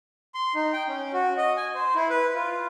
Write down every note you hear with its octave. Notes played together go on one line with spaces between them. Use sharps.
C6
D#4
G5
C#4
F#4
D#5
G#5
C5
E4
B4
F4